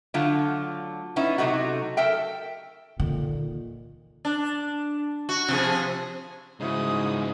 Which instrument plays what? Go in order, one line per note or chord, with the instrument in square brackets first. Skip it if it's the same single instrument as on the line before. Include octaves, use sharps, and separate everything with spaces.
[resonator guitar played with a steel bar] D3 F#3 A3 F4
B3 C#4 D#4 E4
C3 F#3 A3 D#4 F#4
A4 A#4 E5 G5
[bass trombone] A#2 [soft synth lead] D3 [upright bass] D#3
[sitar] D4
F#4
C3 F3 G#4
[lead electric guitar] E2 C#3 [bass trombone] G#2 [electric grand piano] D#4 E4 F#4 [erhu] D#6